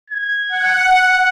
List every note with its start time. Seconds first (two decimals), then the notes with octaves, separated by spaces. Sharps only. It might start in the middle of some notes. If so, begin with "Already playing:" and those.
0.10 G#6
0.49 F#5
0.96 F#6